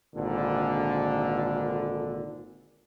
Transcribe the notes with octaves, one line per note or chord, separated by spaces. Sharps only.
G#1 A#2 D3